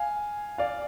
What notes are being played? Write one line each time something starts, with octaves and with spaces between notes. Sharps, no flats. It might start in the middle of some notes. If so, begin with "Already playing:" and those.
Already playing: F5 G#5
D5 F5